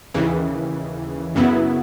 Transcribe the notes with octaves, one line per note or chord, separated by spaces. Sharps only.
D#2 C#3 E3
F#2 C#3 F#3 B3 E4